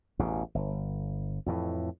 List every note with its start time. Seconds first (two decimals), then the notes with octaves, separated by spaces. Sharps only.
0.19 A1 E2 B2
0.55 G1
1.46 F2 A2 E3